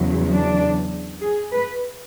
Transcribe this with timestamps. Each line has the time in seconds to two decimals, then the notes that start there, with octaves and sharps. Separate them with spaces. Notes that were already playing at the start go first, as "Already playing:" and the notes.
Already playing: E2 C#3 F#3
0.32 D4
1.21 G#4
1.52 B4